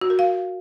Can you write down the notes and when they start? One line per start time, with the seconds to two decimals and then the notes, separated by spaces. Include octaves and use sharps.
0.01 F#4
0.10 A#4
0.19 F5